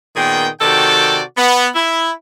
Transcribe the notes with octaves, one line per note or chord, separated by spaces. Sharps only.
A#2 D#3 B3 G#4 G5
C3 D#3 F#4 A4 D5 G5
B3
E4